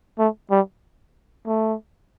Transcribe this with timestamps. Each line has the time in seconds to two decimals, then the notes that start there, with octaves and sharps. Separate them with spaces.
0.19 A3
0.51 G3
1.46 A3